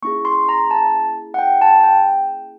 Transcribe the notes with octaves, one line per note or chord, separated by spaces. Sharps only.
A#3 C#4 E4 G#4 C#6
C6
A#5
A5
F#5
G5
A5
G5